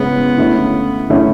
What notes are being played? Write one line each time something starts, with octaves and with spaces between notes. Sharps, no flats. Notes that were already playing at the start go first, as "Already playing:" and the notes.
Already playing: C#3 G#3 B3 C#4 E4
D3 A3 C#4 E4
D3 A3 C#4 E4